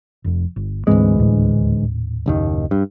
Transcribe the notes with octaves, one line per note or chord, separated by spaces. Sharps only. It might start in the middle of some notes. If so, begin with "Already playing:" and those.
F1 F2
G1
D2 G#2 E3 G#3 C4
D#1 A2 D4
F#1 D#2 D#3
G2